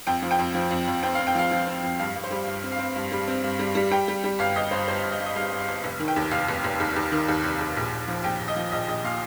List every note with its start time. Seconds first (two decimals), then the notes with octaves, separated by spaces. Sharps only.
0.07 F2 G5
0.22 F3
0.31 G5
0.39 F2
0.54 F3
0.71 F2
0.88 F2
1.03 C4 G5
1.15 F5
1.19 C4
1.27 G5
1.35 F3 F5
1.51 F3
1.67 C4
1.83 F2
1.99 G2 F5
2.15 G2
2.23 C5
2.31 G3
2.47 G2
2.64 C4
2.72 F5
2.79 C4
2.96 G2
3.12 G3
3.28 C4
3.44 G2
3.59 G3
3.75 G3
3.91 G3 G5
4.08 G3
4.24 G3
4.39 G1 F5
4.56 G1 D#5
4.71 G2 C5
4.88 G1 C5
5.04 G1
5.12 D#5
5.20 G2
5.26 D#5
5.36 G3 F5
5.52 G2
5.60 F5
5.68 G1
5.84 F1
5.99 D#3
6.08 G5
6.16 D#2
6.31 F1 F5
6.48 F1
6.64 F1
6.80 D#2
6.96 D#2
7.12 D#3
7.28 D#2
7.44 F1
7.60 D#2
7.76 A#1
7.92 A#1
8.08 F3
8.24 A#1 G5
8.40 A#1
8.48 D#5
8.56 F3
8.72 A#1 D#5
8.88 A#1 D#5
9.04 A#2 F5